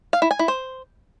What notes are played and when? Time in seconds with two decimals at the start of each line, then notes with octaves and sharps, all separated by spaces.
0.13 F5
0.22 E4
0.31 G#5
0.39 E4
0.48 C5